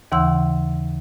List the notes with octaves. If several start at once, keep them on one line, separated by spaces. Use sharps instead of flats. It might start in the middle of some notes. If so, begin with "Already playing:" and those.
D#2 C#3 E3 F#5 C6 E6